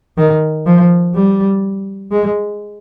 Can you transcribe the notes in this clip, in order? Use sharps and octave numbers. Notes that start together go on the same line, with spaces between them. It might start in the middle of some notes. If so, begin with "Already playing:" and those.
D#3
F3
G3
G#3